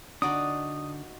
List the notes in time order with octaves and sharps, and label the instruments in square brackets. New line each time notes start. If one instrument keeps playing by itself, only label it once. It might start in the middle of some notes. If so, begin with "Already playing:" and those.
[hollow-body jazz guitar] D3 D4 [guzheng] D#4 F#4 D5 [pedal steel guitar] D#6